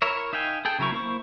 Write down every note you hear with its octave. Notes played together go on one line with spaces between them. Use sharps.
E4 A#4 C#5 E5
D#4 E5 F5 G5 G#5
G#4 A4 G5
C#3 F#3 E4 A#4 C#6
A#3 E4 C5 C#6